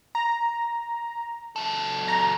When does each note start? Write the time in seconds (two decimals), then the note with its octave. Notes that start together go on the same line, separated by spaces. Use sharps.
0.15 A#5
1.56 F#3 A4
2.08 A#5